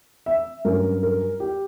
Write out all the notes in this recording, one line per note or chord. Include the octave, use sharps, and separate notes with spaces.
E5
G2 F#3 C#4 A#4
A#4
G4